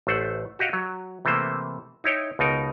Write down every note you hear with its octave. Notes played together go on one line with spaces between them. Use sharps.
A1 A3 C5 F#5
F#4 G4 D#5 F5 F#5
F#3
C3 E3 A3 A#3 C5
D#4 E4 C#5 G5
C#2 B2 D#4 A#4